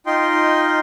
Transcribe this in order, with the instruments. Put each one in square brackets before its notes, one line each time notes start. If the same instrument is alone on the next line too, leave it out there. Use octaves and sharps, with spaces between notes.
[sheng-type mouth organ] D#4 F4 D#5 G5 C6